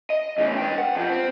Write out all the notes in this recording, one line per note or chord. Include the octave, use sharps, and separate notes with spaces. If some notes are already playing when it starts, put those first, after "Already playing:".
D#5
E2 A2
B4 G5
F#5
F2 F3
C4